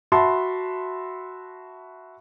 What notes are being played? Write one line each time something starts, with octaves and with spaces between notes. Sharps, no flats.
F#4 E5 A5 B5 C6